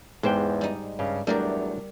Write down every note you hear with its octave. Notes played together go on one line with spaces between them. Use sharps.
E2 G#2 G#3 B3 G4 C5 G5
G3 D#4
G2 C#3
E2 F#3 G3 A3 D4 A#4 D5